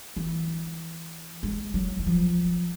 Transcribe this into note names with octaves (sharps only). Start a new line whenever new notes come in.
E3
G#3
F#3
E3
F3